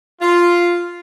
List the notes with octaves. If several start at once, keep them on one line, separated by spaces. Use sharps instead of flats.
F4